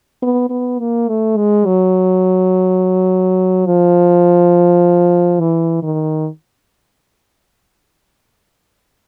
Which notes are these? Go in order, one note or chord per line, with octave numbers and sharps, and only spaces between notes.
B3
B3
A#3
A3
G#3
F#3
F3
E3
D#3